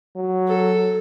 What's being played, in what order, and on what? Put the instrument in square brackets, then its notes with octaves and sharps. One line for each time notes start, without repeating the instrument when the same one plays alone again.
[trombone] F#3
[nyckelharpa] A4